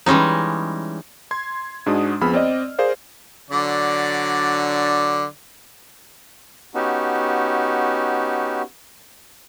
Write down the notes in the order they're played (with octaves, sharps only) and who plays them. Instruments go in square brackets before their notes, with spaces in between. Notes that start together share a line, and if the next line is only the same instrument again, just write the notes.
[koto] E3 G3 G#3 C#4 D#4
[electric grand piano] C6 G#6
G#2 G#3 D4 F#4 D#6
F2 B3 G#4 B5 E6 F6
C4 D5 D#5
G#4 A#4 C5 D5 F5
[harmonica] D3 F#3 D5
[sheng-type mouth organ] B3 C#4 D#4 F#4 G4